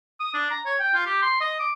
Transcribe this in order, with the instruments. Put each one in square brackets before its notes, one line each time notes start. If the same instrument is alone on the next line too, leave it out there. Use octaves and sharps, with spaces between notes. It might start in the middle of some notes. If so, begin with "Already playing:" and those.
[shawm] D#6
D4
A#5
C#5
G5
F4
G4
C6
D#5
D6